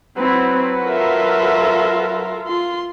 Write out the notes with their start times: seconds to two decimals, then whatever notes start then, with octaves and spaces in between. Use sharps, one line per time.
0.17 F#3 C4 E4 B4
0.85 F4 A4 A#4 E5
2.47 F4 C6